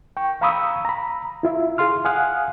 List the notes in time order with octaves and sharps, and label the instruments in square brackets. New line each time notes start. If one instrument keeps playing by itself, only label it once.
[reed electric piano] G5 C#6
F5 A#5 B5 C#6 D#6 E6
A#5 B5
E4 F4 E5
G#4 F5 C6 F6
F5 F#5 G#5 D#6 F6 F#6